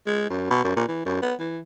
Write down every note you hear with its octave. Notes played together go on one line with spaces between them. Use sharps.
G#3
F#2
B2
F#2
A#2
E3
F#2
B3
E3